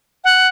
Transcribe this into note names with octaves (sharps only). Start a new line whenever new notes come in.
F#5